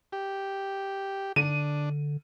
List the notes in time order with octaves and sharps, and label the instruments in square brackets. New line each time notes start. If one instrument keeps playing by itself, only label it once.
[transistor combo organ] G4
[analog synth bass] D3 [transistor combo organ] D4 [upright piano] D#7